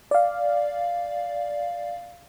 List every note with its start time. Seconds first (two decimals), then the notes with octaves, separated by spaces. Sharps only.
0.11 D5 F5